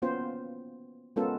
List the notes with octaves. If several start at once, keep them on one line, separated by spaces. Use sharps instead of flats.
A#3 B3 C#4 F4 C5
G#3 B3 C#4 F4 A4 A#4